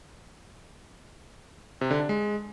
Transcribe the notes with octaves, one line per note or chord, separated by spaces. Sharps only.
C3
D3
D4
G#3